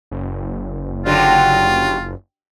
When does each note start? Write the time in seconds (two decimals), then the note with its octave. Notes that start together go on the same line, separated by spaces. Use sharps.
0.11 F#1
1.05 D3 F#3 G3 F4